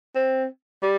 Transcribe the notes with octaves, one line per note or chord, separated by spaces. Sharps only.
C4
G3